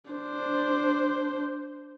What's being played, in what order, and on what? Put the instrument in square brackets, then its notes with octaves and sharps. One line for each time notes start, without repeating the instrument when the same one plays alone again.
[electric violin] D4 C5